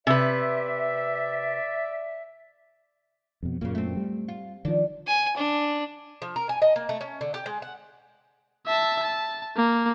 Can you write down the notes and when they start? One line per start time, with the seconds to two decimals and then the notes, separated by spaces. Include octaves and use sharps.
0.07 C3 B4 D5 E5
3.43 F2 B2
3.61 F#2 A#2 C#3 A#3
3.75 A3 C4
3.97 G3
4.28 F4
4.65 D#3 F3 D4
5.07 G#5
5.37 D4
6.22 F3
6.36 A#4
6.49 G#5
6.62 D#5
6.76 A#3
6.89 A3
7.01 C#4
7.21 D3
7.34 G4
7.46 G#3
7.62 F#5
8.66 E5 A5
9.03 A5
9.56 A#3